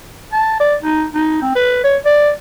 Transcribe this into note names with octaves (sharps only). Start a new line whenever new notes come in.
A5
D5
D#4
D#4
C4
B4
C#5
D5